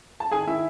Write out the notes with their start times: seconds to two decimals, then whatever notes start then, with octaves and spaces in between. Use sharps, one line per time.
0.20 A5
0.31 D#3 G#4 G#5
0.47 D#3 E4 E5